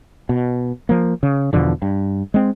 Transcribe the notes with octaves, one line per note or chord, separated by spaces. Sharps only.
B2
F3 A#3
C#3
E2 B2 D3 F3
G2
G#3 C4